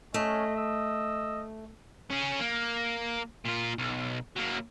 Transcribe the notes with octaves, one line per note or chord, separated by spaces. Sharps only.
A3 C#4 D#5
D#5 E6
C#4 G#4
A#3
A#2 F4
B1
F#3 A#3